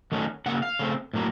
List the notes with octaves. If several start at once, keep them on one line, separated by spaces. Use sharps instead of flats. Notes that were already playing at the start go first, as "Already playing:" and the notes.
D#3 F#3 A3 C#4
C#3 F#3 A#3 F#5
F5
C#3 A3 C4
A2 F#3 A#3